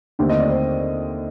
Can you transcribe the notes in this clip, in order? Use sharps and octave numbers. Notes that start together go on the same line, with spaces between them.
D#2 D3 A3 C4 G4
D#5
D5
C5